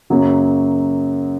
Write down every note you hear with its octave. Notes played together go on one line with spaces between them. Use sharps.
F#2 C#3 F#3 A#3